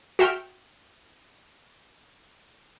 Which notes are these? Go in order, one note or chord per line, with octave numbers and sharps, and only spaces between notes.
F#4 E5 G5 F6